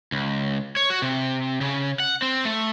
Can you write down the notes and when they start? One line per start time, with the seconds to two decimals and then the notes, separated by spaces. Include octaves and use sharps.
0.12 C#2
0.77 C#5
0.90 F#4
1.02 C3
1.61 C#3
2.00 F#5
2.22 C4
2.45 A3